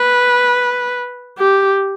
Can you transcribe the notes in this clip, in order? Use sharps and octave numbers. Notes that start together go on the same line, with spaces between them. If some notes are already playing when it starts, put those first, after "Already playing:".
Already playing: B4
G4